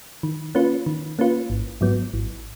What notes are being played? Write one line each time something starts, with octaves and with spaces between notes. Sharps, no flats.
D#3
A#3 C#4 F4 B4
D#3
A#3 C#4 F4 B4
G#1
G#2 F#3 B3
G#1